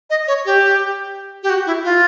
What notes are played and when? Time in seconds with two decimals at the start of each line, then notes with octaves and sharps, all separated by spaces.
0.10 D#5
0.27 C#5
0.45 G4
1.43 G4
1.50 F#4
1.66 E4
1.84 F4